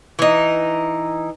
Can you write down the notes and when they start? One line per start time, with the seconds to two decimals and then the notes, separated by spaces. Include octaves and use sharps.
0.19 E3 D#4